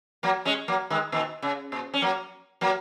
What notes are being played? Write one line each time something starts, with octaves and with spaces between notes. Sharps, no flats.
F#3 A#3
G#3 C#4
F#3 A#3
D#3 G#3
A#2 D#3
C#3
A#2
C#4
F#3 A#3
F#3 A#3